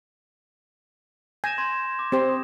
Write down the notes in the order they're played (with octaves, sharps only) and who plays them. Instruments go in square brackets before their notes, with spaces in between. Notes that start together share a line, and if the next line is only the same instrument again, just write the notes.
[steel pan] G#5 [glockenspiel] G6 A#6 E7
[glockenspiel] C6 G#6
D6
[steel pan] C4 G4 C5
[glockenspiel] D#6